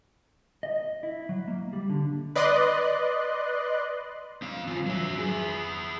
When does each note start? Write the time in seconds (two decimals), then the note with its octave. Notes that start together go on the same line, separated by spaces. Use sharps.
0.63 D#5
1.03 E4
1.29 F#3
1.48 A#3
1.73 G3
1.90 D3
2.36 B4 D5 D#5 C6 F#6
4.42 C4 F5
4.67 E3 F4
4.86 F#3 E5
5.17 E4 G#4